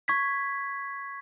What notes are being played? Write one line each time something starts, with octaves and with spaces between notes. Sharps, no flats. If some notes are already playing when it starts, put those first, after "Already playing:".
C#6 G#6 B6